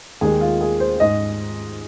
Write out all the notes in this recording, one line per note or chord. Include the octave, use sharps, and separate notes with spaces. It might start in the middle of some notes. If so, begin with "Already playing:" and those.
D#2 D#3 G#3 G#4
F4
G#4
C5
G#2 G#3 D#5